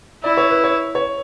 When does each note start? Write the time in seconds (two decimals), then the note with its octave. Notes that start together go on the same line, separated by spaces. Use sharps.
0.24 E4 D5
0.37 C#5
0.51 B4
0.64 C#5
0.95 C#5